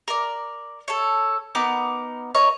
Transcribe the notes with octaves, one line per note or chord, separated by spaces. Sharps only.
A#4 D5
A4 C#5
B3 D#4 A#4 D6
A#4 C#5 D#5